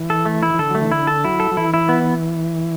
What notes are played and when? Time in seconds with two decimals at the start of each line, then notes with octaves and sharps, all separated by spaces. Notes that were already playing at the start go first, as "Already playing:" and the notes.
Already playing: E3
0.10 A4
0.26 A3
0.43 E4
0.54 E3
0.58 D3 A4
0.70 F#3 A3
0.81 E3
0.91 D3 E4
1.07 A4
1.24 F#3 E4
1.40 A4
1.51 F#3
1.57 E3 E4
1.74 E4
1.89 B3